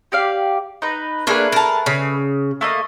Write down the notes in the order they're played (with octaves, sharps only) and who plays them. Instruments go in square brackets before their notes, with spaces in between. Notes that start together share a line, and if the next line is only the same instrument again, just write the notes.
[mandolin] G4 D5 F5
D#4 B4
[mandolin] A3 G#4 B4 [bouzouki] A#3 D4
[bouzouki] A#4 A5
C#3
[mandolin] A3 A#3 D#5